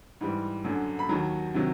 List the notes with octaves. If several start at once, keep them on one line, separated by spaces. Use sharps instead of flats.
G#2 E3 G3
F#2 D3 F#3
B5
D#2 D#3 F#3 A#5
C3 D#3 F#3